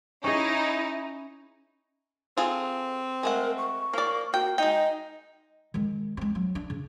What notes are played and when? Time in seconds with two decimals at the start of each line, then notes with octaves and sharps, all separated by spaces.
0.24 C#4 D#4 E4 G#4
2.38 C4 F4 G#4 A4
3.23 G#3 A3 A#4 F#5
3.58 C#6
3.93 F3 A#3 D5
4.34 A#3 F#4 G5
4.58 G#3 D#4 D#5 G5
5.74 D#3 G#3
6.17 G#3 C4
6.35 F#3
6.55 D4
6.70 C#3